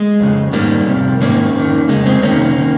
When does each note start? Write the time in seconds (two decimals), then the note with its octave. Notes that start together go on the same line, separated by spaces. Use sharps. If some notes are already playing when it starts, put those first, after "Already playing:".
Already playing: G#3
0.20 F2 C#3
0.53 G#2 D#3 G3 A#3
0.87 F2 C3
1.21 G#2 D#3 A#3 C#4
1.55 F2 D#3
1.89 F2 C#3 G#3
2.06 G#3 C4
2.23 F2 C3 D#3 A#3 C#4
2.58 D#3